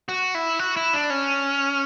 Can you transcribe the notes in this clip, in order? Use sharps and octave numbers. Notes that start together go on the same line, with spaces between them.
F#4
E4
F#4
E4
D4
C#4